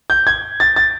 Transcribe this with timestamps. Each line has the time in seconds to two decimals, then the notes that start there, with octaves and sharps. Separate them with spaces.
0.10 G6
0.27 G#6
0.60 A6
0.76 A6